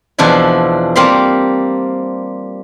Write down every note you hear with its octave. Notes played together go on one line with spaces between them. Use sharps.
E2 B2 F3 D4 E4
G3 A#3 C4 F5 B5 C6